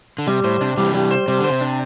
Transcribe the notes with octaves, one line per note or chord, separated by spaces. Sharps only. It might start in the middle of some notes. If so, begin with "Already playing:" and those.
D3
C3 G3
A2 C5
C3 D4
C3 E3 G3
G3
C5
C3 G3
D3
C5
C3
D4